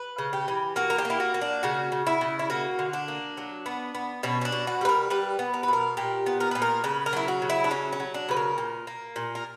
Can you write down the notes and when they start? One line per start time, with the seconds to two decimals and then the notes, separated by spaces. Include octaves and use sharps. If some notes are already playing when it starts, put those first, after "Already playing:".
Already playing: B4
0.18 C#3
0.33 G4
0.48 E3
0.76 A#3 F#4
0.90 A#4
0.98 G4
1.05 A#3 E4
1.20 F#4
1.34 A#3
1.41 D4
1.63 C#3 F#4
1.92 C#3
2.07 E4
2.21 C#3
2.39 E4
2.50 A#3 F#4
2.79 D3
2.93 D4
3.08 A#3
3.37 F#3
3.66 B3
3.95 B3
4.23 B2 C#4
4.41 C#4
4.45 D4
4.52 B2
4.67 F#4
4.81 G3 B4
4.89 A#4
5.10 G3 B4
5.39 B3
5.54 A#4
5.63 B4
5.68 B2 A#4
5.97 A#2 G4
6.26 B3
6.40 A#4
6.51 A#2 B4
6.62 A#4
6.84 C#3 B4
7.06 A#4
7.13 F#3 E4
7.28 F#4
7.42 C#3
7.50 E4
7.64 D4
7.71 F#3 C#4
7.93 C#4
8.00 F#3
8.14 D4
8.29 C#3 B4
8.37 A#4
8.58 A#2
8.87 A#3
9.16 A#2
9.35 A#4